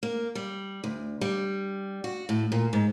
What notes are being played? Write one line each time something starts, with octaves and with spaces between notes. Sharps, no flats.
A#3
G3
D2
G3
F#4
A2
A#2
G#2